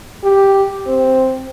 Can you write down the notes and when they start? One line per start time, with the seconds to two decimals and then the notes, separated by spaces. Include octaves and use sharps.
0.24 G4
0.87 C4